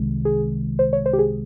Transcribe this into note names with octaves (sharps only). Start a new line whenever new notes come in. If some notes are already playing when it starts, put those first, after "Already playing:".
Already playing: C2 C3 D#3 G#3
G#4
C5
C#5
C5
G4
G#4